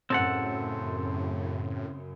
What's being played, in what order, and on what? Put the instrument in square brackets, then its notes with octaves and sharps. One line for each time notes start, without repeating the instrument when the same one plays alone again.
[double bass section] F#2 C#3 [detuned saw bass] A2 [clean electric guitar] C4 A4 F#5